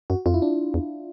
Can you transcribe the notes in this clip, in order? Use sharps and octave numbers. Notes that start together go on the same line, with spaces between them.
F#2 F#4
F2 F4
E4
D4
E2